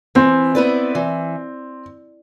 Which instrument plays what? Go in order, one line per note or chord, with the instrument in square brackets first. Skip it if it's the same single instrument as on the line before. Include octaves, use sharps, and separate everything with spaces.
[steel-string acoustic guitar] E3 [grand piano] C4
[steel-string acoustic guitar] B3 E4 B4 D5
E3